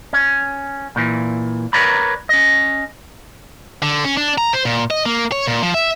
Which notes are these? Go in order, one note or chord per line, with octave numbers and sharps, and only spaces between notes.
C#4
A#2 E3
A#4 B4 C#5 D5 A#5 B5
C#4 D#5
D3
C#4
D4
A#5
C5
A#2
D#5
A#3
C#5
A#2
F3
E5